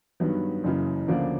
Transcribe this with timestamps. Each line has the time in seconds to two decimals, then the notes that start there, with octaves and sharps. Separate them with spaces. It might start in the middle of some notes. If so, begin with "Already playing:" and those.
0.20 G2 D#3 F#3 B3
0.64 F#1 F#2 C#3 E3
1.08 D2 C#3 F3 A#3 D4